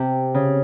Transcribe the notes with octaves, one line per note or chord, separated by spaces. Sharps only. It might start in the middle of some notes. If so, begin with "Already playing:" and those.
Already playing: C3
C#3